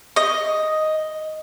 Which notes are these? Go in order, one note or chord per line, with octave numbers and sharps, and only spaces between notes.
D#5